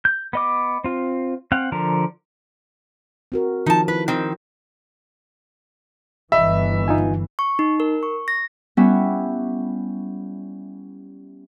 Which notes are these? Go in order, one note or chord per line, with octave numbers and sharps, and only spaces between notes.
G6
B3 D#5 D6
C4 F4
C4 F5 F#5
D3 F3 A#4
C4 F#4 A#4
D#3 F3 D#4 F4 A5
E4 F4 B4
D#3 C4
G1 E3 D#5 E5 B5
D#4 F4 G#5
C#6
D#4
A#4
C#6
A#6
G3 B3 C#4 E4 E5